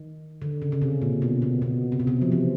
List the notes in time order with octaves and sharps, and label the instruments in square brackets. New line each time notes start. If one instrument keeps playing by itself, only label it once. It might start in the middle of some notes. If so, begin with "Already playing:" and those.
Already playing: [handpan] D#3
D3
C#3
C#3
C3
A#2
B2
B2
B2
C3
B2
C3
F3
E3